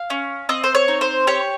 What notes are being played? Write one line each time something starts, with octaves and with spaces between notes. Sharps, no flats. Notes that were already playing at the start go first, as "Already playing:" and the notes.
Already playing: F5
C#4
C4 D#5
C5
C#5
D#4
C5
G4 C#5